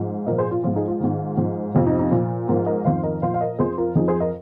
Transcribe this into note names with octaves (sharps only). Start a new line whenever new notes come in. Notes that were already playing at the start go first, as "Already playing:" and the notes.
Already playing: G#2 F3
A#2 A#4 D#5
F3
G#4 C5
F4
G#2 F3 F4
D#4 G#4
F4
G#2 D#3
G#2 F3
F2 C3 F3 F4
D#4
D#4
A#2 F3 F4
G#2 F3 F4 A#4
A#4 D#5
F2 D#3 C5 F5
A#4 D#5
A#2 F3 C5 F5
F5
A#4 D#5
F2 F3 G#4 C5
F4 A#4
F2 F3 D#4 G#4
G#4 C5
A#4 D#5